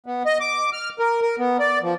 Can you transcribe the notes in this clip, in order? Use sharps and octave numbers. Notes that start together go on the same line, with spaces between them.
B3
D#5
D6
F6
A#4
A#4
B3
D5
F3